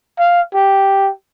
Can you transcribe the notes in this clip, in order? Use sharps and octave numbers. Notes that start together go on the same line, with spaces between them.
F5
G4